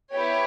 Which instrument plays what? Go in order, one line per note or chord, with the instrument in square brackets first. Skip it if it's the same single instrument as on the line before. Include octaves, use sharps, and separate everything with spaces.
[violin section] B3 E4 G4 C#5